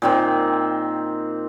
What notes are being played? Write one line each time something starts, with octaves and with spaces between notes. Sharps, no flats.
A#2 D#3 C4